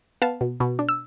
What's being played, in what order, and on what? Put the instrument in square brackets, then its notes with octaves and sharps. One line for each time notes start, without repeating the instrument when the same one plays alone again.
[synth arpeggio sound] B3 F5 A5
B2
B2
D4
E6